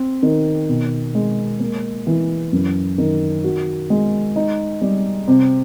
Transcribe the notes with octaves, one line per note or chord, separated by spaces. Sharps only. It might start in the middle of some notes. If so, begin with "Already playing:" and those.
Already playing: C4
D#3
B2
G#3
A#3
E3
F#2
D#3
F#4
G#3
D#4
G3
C3